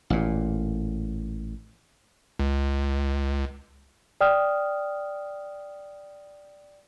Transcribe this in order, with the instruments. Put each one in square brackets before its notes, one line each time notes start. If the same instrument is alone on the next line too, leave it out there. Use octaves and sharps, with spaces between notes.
[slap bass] A1 A#2
[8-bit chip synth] C#2
[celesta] D5 G5 D#6 F6